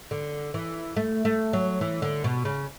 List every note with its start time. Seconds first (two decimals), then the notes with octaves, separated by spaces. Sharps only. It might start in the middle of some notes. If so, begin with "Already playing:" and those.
0.11 D3
0.54 E3
0.97 A3
1.25 A3
1.53 F#3
1.81 E3
2.02 D3
2.24 B2
2.45 C#3